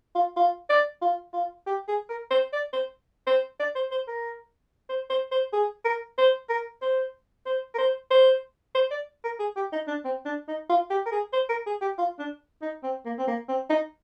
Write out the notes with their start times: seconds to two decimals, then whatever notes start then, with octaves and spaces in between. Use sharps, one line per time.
0.15 F4
0.37 F4
0.70 D5
1.02 F4
1.33 F4
1.67 G4
1.88 G#4
2.09 A#4
2.31 C5
2.53 D5
2.73 C5
3.27 C5
3.60 D5
3.75 C5
3.91 C5
4.08 A#4
4.89 C5
5.10 C5
5.32 C5
5.53 G#4
5.85 A#4
6.18 C5
6.49 A#4
6.82 C5
7.46 C5
7.75 A#4
7.78 C5
8.11 C5
8.75 C5
8.91 D5
9.24 A#4
9.39 G#4
9.56 G4
9.73 D#4
9.88 D4
10.05 C4
10.25 D4
10.48 D#4
10.70 F4
10.90 G4
11.06 A#4
11.12 G#4
11.33 C5
11.49 A#4
11.66 G#4
11.81 G4
11.98 F4
12.19 D4
12.62 D#4
12.83 C4
13.05 A#3
13.18 C4
13.28 A#3
13.49 C4
13.70 D#4